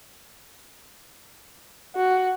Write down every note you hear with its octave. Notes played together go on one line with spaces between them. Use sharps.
F#4